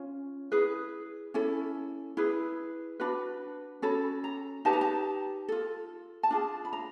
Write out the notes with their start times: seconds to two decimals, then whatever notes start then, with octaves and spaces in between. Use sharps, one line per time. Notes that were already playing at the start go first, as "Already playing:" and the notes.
Already playing: C#4 F4
0.52 E4 G#4 B4
1.34 C#4 E4 A4
2.17 E4 G#4 B4
3.00 D4 F#4 B4 B5
3.82 C#4 F#4 A4 B5
4.24 A#5
4.65 D#4 G4 B4 A5
4.73 A#5
4.81 A5
5.48 F4 A4
6.23 A5
6.30 D4 F4 G#4
6.65 B5
6.73 A#5